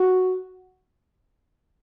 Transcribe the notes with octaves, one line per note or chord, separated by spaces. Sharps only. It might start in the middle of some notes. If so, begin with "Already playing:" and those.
Already playing: F#4